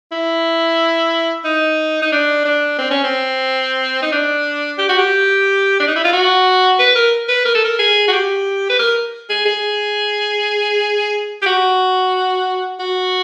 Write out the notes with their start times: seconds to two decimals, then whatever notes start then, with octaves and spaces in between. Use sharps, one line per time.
0.12 E4
1.44 D#4
2.02 D#4
2.12 D4
2.45 D4
2.78 C4
2.91 C#4
3.04 C4
4.02 D#4
4.12 D4
4.79 G4
4.89 F#4
4.99 G4
5.80 D4
5.88 D#4
5.96 E4
6.04 F4
6.13 F#4
6.79 B4
6.95 A#4
7.29 B4
7.45 A#4
7.55 A4
7.65 A#4
7.79 G#4
8.08 F#4
8.13 G4
8.70 B4
8.79 A#4
9.30 G#4
9.46 G#4
11.42 G4
11.46 F#4
12.80 F#4